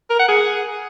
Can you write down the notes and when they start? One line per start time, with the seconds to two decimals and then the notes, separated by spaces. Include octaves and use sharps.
0.10 A#4
0.19 F#5
0.29 G#4